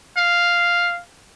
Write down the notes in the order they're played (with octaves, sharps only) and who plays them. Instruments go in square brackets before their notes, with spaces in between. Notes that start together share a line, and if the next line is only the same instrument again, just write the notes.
[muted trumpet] F5